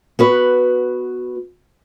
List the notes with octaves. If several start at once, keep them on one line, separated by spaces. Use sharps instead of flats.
B3 F#4 B4